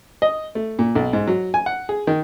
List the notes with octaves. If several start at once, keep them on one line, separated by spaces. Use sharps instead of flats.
D#5
A3
A#2
B1
G#2
F#3
G#5
F#5
G#4
D#3